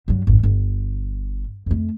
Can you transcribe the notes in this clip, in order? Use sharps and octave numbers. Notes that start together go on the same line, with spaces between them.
G2 F#3
G#1 F2
G1
F2 A3